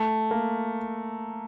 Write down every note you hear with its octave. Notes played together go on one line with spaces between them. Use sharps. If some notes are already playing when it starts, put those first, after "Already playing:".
Already playing: A3
A#3